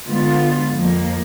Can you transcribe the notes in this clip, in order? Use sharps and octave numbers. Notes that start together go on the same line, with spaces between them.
D3 G#3 B3 F4
F2 F3 A#3